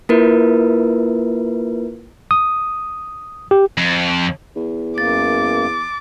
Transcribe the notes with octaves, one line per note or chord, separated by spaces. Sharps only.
A#3 E4 F4 A#4 B4
D#6
G4
F2
E2
F#2 A#3 D6 A6